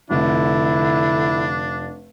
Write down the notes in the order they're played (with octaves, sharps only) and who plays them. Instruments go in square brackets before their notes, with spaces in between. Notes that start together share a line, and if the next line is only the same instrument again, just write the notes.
[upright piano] F1 [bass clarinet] D3 [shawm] D4 [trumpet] E4